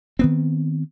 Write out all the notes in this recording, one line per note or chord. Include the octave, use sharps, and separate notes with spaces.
D#3 B3 C4